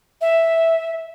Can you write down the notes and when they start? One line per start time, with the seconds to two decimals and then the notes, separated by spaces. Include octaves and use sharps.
0.21 E5